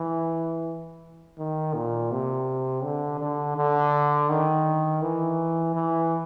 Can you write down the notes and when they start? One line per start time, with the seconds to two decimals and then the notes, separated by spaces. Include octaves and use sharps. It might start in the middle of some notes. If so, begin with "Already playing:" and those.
Already playing: E3
1.38 D#3
1.74 A#2
2.12 C3
2.84 D3
3.20 D3
3.57 D3
4.30 D#3
5.02 E3
5.75 E3